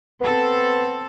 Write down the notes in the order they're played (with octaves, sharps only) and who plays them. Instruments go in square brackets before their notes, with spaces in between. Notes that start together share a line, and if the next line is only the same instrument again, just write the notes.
[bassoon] B3 [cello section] C4 A4